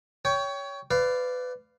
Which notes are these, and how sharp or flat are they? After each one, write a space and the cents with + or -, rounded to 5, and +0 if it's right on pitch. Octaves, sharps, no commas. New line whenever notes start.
C#5 +20 G5 +0
B4 +25 D5 -5 F5 +0